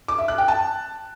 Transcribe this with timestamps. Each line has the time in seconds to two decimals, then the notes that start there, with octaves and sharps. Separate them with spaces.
0.08 D6
0.18 E5
0.28 F#6
0.38 G5
0.48 A5